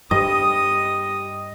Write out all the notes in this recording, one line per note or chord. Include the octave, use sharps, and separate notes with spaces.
G2 G3 D#5 D#6